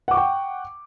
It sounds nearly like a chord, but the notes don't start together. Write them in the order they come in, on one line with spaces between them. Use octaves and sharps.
F#5 D6 C#6 G5